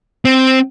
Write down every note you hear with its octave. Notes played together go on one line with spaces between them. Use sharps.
C4